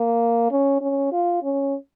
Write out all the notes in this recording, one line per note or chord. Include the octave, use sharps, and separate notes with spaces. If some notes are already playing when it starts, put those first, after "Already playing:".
Already playing: A#3
C#4
C#4
F4
C#4